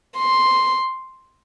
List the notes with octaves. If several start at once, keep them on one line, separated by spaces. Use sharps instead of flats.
C6